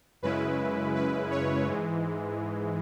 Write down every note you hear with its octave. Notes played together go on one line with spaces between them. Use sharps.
F#2 C#3 G#3 C#4 E4 B4
B4
C#5
G#2 E3 G#3